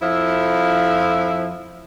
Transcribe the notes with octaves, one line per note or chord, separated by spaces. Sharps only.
F2 F3 E4